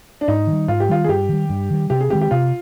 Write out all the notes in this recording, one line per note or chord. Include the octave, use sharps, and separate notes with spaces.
D4
G#2 D#4
D#3
G3
G#2 F4
G4
D#3 G3 F4
G#4
G2 G4
D#3 G3
G2
D#3 G3
C3 G4
G#4
D#3 G#3 C4 G4
G4
C3 F4